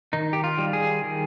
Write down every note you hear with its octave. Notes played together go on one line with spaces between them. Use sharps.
D#3 D#4
G4
F4
G3
G#4
D#3